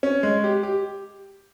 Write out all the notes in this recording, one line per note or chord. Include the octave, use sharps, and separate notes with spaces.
C#4
G#3
G4
G4